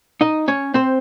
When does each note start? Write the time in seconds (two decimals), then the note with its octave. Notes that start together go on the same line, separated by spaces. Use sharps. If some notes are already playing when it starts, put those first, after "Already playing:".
0.21 D#4 D#5
0.48 C#4 C#5
0.74 C4 C5